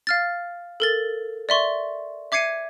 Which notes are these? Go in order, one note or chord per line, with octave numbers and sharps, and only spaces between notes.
F5 F6 A6
A4 A#4 A6
D5 E5 C6 C#6
E5 D6 G#6 C7 C#7 D#7